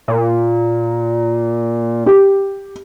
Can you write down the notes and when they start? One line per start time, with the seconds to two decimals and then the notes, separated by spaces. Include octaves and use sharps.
0.08 A#2
2.06 G4